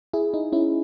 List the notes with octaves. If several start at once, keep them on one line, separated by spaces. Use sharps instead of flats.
E4 G#4
D#4
C#4 E4